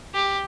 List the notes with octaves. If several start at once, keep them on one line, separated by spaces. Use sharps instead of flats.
G4